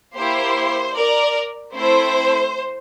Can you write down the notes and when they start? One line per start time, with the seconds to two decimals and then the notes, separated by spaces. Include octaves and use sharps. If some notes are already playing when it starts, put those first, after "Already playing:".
0.15 A#3 E4 G4 C5
0.95 A#4 D5
1.74 A3 C4 E4 C5